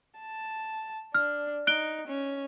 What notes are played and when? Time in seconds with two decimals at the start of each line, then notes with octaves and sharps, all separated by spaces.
0.20 A5
1.14 D4 F6
1.67 D#4 F#6 D7 G7
2.08 C#4